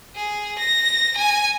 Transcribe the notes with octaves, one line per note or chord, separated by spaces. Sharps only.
G#4
A#6
G#5